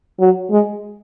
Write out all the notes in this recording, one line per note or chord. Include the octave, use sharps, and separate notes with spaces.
F#3
G#3